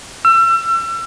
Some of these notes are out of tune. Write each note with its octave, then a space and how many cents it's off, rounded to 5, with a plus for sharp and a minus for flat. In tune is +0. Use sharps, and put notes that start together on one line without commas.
E6 +35